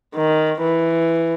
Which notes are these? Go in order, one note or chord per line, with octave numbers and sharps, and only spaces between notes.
D#3
E3